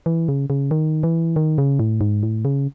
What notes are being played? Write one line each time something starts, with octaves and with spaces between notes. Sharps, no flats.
E3
C#3
C#3
D#3
E3
D#3
C#3
A2
G#2
A2
C#3